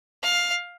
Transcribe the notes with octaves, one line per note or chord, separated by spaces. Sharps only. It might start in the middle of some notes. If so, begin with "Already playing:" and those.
F5